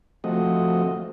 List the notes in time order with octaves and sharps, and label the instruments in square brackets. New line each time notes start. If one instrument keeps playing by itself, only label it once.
[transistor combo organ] F3 A3 C4 F#4 D#5